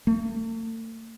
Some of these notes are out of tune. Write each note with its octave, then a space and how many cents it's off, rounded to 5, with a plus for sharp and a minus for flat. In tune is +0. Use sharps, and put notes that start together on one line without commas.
A3 +45